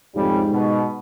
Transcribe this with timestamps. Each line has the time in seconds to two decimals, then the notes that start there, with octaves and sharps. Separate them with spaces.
0.15 F2 G#2 C#3 G3
0.52 B2